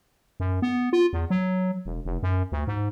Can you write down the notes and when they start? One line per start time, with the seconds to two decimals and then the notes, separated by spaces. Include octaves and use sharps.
0.40 F#2
0.62 B3
0.93 F4
1.13 E2
1.30 F#3
1.86 E1
2.05 F1
2.23 F#2
2.52 D2
2.67 G#2